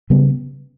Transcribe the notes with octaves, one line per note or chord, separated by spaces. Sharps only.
C#3 G3 B3